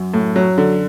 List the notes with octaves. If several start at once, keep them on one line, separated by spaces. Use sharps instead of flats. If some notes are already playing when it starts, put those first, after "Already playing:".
Already playing: F#2
A2
F#3
D3